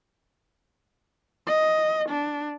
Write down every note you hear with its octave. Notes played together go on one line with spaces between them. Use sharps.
D#5
D4